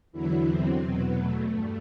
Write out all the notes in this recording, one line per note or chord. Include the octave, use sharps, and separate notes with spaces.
E2 D3 E3 F#3 E4
C3 C4
E2 B2 F#3 B3
A3
G2